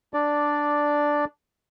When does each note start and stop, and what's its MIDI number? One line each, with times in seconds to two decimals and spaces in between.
0.14 1.25 62
0.14 1.25 74